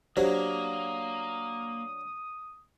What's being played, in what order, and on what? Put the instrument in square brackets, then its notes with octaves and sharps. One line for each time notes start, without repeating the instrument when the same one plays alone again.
[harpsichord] F#3 D4 [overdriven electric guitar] A#3 [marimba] G4 C5 [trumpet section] D#6